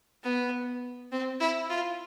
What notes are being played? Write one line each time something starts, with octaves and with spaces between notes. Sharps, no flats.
B3
C4
E4
F4